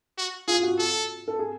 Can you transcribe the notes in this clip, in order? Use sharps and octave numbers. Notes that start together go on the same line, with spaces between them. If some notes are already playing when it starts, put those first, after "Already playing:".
F#4
F4 G#4
F#4
A4
A4
G#4